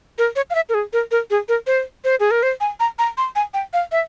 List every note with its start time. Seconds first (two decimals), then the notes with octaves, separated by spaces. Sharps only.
0.18 A#4
0.36 C#5
0.50 F5
0.55 E5
0.69 A#4
0.74 G#4
0.93 A#4
1.11 A#4
1.30 G#4
1.49 A#4
1.67 C5
2.04 C5
2.20 G#4
2.31 A#4
2.43 C5
2.61 G#5
2.80 A#5
2.99 A#5
3.18 C6
3.36 G#5
3.54 G5
3.73 F5
3.92 E5